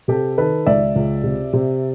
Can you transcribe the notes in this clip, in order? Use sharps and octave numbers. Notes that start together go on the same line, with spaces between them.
C3 G4 A4
D#3 A4 B4
C#2 D5 E5
C#2
C3
C3